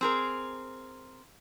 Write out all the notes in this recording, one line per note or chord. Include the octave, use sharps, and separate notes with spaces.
C4 G#4 A#4